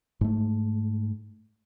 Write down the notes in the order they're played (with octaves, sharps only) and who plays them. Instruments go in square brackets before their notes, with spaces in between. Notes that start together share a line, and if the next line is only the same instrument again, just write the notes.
[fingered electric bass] G#2 A3